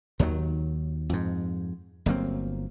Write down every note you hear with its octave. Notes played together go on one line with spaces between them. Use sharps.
D#2 D#3 F3 F#3
F2 G#2
G1 F#3 A#3 C4